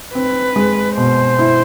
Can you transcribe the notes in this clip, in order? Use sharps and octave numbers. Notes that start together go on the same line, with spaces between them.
C4 B4
G#3
B2 C5
E4